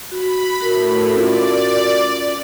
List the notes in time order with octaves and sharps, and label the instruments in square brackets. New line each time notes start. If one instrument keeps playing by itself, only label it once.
[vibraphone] F#4 [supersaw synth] B5
[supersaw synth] A2 [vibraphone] F#4 A#4
[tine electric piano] C#4 F4 [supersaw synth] D5